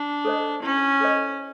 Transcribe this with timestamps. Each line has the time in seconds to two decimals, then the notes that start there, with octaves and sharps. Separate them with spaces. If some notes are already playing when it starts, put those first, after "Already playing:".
Already playing: D4
0.25 A4 C5 D#5
0.63 C#4 E4
1.00 A4 C5 D#5